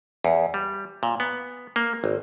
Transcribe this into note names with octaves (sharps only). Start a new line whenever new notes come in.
E2
G3
A#2
B3
A#3
G#1